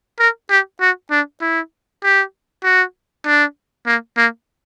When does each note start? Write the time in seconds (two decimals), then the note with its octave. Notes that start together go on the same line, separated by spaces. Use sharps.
0.19 A#4
0.50 G4
0.81 F#4
1.11 D4
1.41 E4
2.03 G4
2.64 F#4
3.26 D4
3.86 A#3
4.17 A#3